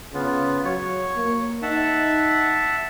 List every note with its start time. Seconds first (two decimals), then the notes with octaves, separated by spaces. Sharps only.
0.14 C#3 B3 F4
0.65 F#3 C#5
1.16 A#3
1.62 D#4 E5 F#5 A5